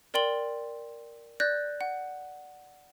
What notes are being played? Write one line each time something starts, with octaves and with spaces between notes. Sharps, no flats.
A#4 D5 G5 C6 F#7 G7
D5 F#6 G6 A#6
F#5